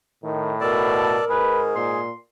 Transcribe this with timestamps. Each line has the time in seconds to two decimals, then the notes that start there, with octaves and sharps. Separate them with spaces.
0.24 A2 D#3
0.61 B2 A4 A#4 D5 A5
1.29 G#2 G#4 B4
1.75 A#2 C6